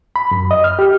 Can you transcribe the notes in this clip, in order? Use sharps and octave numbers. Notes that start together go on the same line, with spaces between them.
B5
F#2
D#5
F6
G4